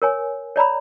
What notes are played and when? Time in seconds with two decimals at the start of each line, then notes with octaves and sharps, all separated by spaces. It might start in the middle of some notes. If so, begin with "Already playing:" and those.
0.02 A#4 C#5 G#5
0.56 C#5 D5 A#5 B5